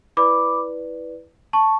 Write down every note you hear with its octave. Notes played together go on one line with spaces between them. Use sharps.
E4 B4 D5 B5 D6
A5 C#6